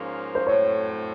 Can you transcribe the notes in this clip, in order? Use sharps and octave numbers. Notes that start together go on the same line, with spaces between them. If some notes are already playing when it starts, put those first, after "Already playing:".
Already playing: G#2 F3 A#3 C#4
C5
A2 F#3 A3 C4 C#5